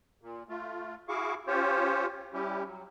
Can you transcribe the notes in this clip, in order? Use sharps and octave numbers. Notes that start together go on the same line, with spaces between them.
A#2
A3 F4
E4 F#4 G#4 F5 C#6 D6
C#4 F4 G4 C5 C#5
G3 C#4 E4 G4
F#3